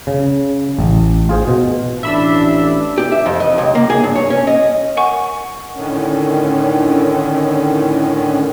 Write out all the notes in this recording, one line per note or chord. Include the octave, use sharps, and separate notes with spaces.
C#3
A1
F4 G#4 C5
B2
A1 D4 E5 B5 E6
G4
E5
F2
D#5
C#2
A#3
G#4
G2
C#5
C#4
D#5
A#4 F#5 G#5 C#6
A2 D3 D#3 C#4